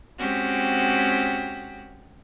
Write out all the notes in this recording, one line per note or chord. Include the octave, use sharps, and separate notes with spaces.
G#3 C4 C#4 F#4 G4